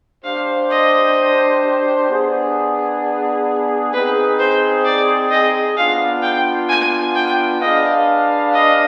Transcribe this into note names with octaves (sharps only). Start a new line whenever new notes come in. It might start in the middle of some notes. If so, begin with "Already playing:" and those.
D4 G4 C5 F5
D#5
B3 D4 G#4
C4 D#4 G#4 B4
C5
D5
D#5
B3 D4 F4 F5
G5
G#5
G5
D4 G#4 B4 D#5 F5
D#5